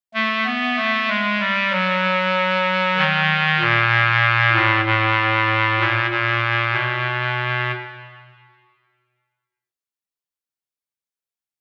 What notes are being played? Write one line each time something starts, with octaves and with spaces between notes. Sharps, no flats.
A3
B3
A3
G#3
G3
F#3
D#3
A#2
A2
A2
A#2
A#2
B2